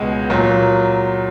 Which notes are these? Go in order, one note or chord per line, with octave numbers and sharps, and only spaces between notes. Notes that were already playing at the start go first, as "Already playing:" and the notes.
Already playing: C#2 B2 G#3 F#5
A#2 F#3